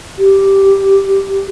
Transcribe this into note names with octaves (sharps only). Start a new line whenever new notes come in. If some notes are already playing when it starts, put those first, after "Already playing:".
G4